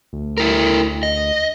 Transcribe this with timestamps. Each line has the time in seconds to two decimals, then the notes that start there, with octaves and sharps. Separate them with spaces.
0.13 D2
0.38 A3 E4 A#4
1.03 D#5